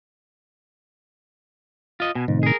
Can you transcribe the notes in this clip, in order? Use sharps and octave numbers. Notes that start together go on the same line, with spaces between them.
F4 D#5
B2 G#5
F2 A2 C3 D#3
G#4 A#4